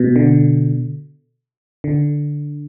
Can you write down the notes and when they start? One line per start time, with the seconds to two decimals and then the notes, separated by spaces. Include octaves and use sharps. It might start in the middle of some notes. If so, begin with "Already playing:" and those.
Already playing: B2
0.16 D3
1.84 D3